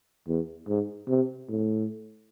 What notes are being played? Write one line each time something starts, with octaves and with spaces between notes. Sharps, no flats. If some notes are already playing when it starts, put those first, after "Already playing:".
E2
G#2
C3
A2